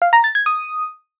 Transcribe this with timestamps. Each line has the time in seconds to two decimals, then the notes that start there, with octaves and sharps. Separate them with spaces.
0.02 F5
0.13 A#5
0.24 A6
0.35 G#6
0.46 D#6